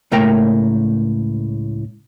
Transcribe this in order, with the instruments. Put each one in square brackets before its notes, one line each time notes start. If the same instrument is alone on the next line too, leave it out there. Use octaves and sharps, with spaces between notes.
[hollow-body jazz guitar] C#2 A2 A3 A#3 A#4 G5